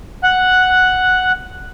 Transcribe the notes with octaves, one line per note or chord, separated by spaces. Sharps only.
F#5 F#6